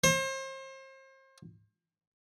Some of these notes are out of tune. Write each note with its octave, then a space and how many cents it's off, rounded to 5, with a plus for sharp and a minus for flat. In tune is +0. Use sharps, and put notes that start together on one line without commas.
C5 +35